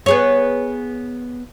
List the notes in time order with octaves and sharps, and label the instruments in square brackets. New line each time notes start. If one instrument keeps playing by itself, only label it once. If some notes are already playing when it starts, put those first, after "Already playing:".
[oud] B3 G#4 C#5